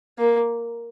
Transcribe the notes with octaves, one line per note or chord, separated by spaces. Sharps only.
A#3